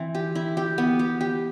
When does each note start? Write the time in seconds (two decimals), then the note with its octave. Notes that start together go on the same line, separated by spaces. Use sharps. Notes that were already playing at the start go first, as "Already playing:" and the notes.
Already playing: E3 C4
0.15 G4
0.35 E4
0.57 G4
0.78 B3
0.99 G4
1.21 G4